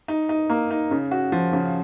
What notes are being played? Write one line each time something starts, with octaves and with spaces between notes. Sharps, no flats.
D#4
D#4
A#3
D#4
C#3
F#4
F3
C#3